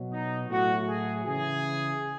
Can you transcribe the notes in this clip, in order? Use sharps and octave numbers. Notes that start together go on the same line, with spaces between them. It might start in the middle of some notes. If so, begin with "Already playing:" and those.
Already playing: B2 F#3
D#4
A2 F#3 F#4
G#4
C#3 E3 G#4